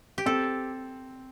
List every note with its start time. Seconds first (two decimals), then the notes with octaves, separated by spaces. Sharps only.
0.18 G4
0.26 C4 A4